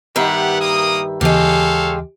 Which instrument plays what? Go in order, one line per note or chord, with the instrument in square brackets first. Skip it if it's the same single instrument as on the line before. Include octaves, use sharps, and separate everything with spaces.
[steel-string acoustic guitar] G2 D#3 E5 [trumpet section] B3 G4 F#5
[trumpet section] A#3 D#6
[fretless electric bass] D#2 C#3 E3 [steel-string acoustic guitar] G#3 G4 [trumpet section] A4 C#5 F5